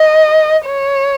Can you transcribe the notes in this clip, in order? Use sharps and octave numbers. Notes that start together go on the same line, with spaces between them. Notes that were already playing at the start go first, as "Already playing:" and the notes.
Already playing: D#5
C#5